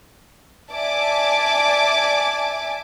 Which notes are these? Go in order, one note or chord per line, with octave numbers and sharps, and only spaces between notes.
D5 E5 G#5 A5 D6